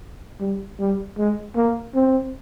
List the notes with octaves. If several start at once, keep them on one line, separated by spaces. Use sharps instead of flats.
G3
G3
G#3
A#3
C4